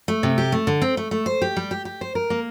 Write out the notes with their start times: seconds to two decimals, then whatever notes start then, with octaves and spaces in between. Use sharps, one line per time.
0.08 A3
0.23 C3
0.38 G4
0.52 A3
0.67 D3
0.82 C4
0.97 A3
1.11 A3
1.26 C5
1.42 G4
1.57 G3
1.71 G4
1.85 G4
2.01 C5
2.15 A#4
2.30 A#3